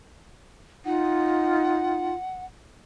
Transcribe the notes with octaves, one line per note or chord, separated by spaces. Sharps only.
D#4 F4 F#5